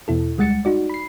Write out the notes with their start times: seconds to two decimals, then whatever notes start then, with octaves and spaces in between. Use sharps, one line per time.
0.08 E2 B2 E4 A4
0.38 D2 G3 G#3 F#5 A6 C#7
0.65 D#4 F#4 D5
0.90 B5 C7